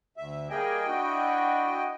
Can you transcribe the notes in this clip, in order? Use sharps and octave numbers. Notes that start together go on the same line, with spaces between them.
D2 E5
G3 A#3 G#4 D#5 G5
D4 E4 F#4